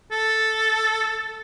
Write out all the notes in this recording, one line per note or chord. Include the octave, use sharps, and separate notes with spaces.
A4